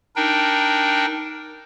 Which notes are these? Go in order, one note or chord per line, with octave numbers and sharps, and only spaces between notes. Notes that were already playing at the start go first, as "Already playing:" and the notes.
D4 D#4 A#4 G5